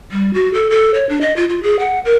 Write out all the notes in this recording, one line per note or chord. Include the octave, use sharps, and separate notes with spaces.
G3
F#4
A4
A4
C#5
D4
D#5
F4
F4
G#4
F#5
A#4